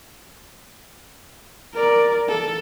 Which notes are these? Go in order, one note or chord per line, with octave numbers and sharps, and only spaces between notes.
A#4 D5
A4